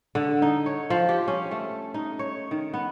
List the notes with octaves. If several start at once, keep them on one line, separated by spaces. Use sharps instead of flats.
D3
D#4
C#5
F3
G4
C#4
A3
D#4
C#5
D#3
B3